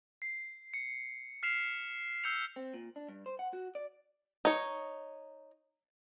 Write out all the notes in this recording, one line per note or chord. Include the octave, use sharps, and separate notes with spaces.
C7
C#7
F6 B6 C7 E7 F7
E6 G6 C7 C#7 F7
C4
A#2
D4
G2
C5
F#5
F#4
D5
D#4 C#5